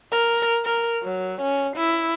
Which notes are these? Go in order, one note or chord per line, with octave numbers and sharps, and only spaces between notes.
A#4
A#4
F#3
C#4
E4